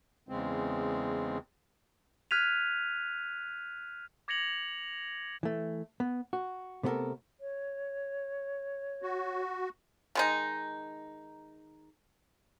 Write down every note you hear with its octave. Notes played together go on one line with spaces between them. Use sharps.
E2 C#3 G#3 C4
F6 F#6 G#6 B6 D#7 F7
D6 G#6 A#6 C#7 F7 F#7
E3 A3
B3
F#4
C3 A3 B3 D4 A4 A#4
C#5
F#4
D#3 G#3 D#4